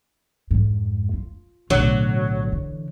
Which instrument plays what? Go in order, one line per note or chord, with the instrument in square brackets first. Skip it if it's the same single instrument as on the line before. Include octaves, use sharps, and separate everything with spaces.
[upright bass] F2 G#2
F4
[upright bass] B1 A2 [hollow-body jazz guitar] D3 [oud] F#3
[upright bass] E3